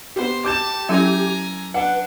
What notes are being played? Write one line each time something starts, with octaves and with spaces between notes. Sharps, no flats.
B3 G4 C5
G4 A5 D6 G6 E7
F#3 C#4 E4 A4 G#5 A#5
D4 B4 F#5